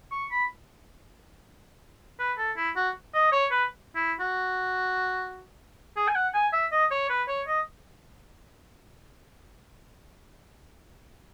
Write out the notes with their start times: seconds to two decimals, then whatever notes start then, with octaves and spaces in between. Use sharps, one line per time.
0.12 C#6
0.31 B5
2.19 B4
2.38 A4
2.57 E4
2.76 F#4
3.14 D#5
3.32 C#5
3.51 B4
3.95 E4
4.20 F#4
5.96 G#4
6.08 G#5
6.15 F#5
6.34 G#5
6.53 E5
6.72 D#5
6.91 C#5
7.09 B4
7.28 C#5
7.47 D#5